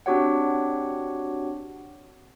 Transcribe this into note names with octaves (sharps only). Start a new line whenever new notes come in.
C4 D4 F#4 G4 C#5 F#5